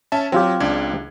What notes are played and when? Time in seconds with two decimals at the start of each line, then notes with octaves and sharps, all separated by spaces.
0.12 C#4 E5 A5
0.32 F#3 C4 F4 G4
0.60 C#2 D4 G#6